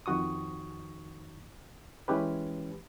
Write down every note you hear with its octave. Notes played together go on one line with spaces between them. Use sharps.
F2 D#3 F#4 C#6 D#6
E3 G#3 C#4 G4 B4